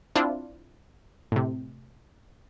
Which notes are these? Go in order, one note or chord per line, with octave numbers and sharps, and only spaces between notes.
C4 D4 E4 F4
A2 C3